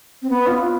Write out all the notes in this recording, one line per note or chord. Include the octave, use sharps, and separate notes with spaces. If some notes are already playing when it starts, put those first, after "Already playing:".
C4
B3
F4